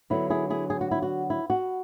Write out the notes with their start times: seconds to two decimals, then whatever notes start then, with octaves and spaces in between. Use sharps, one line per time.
0.10 D3 F#3 B3 E4
0.30 E4 G#4
0.50 E4 G#4
0.70 G#4
0.81 F#4
0.91 E4
1.02 F#4
1.30 E4
1.50 F#4